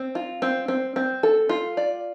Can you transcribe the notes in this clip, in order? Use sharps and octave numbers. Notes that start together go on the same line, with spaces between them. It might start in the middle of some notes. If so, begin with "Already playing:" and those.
Already playing: C4
F4
C4
C4
C4
A4
F4
D5